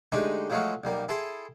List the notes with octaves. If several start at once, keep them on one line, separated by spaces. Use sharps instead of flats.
D3 G#3 A3 D#4 G4 A4
F3 F#3 G#3 A3 F4 F#4
B1 G3 A#3
E4 G#4 A4 G5 A5 C6